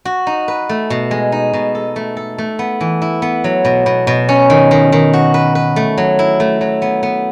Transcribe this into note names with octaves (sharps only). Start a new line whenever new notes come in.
F#4
D#4
B4
A3
B2
G#3
D#4
B2
A4
A3
A4
A3
B3
E3
E4
B3
F#3
B2
B2
B2
C#4
D#3
D#3
D#3
F#4
B4
B4
A3
F#3
E4
A3
F#3
B3
B3